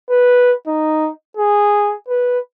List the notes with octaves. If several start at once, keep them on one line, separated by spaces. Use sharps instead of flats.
B4
D#4
G#4
B4